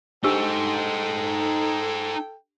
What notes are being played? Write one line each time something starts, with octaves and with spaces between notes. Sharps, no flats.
D4 D#4 G4 A4 C5 G5 E6